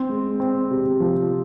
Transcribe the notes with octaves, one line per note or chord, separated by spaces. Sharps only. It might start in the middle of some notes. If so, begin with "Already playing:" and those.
Already playing: C4
G#3
C4
C3
F3